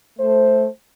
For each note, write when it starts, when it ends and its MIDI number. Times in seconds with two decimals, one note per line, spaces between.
0.19 0.66 57
0.19 0.66 72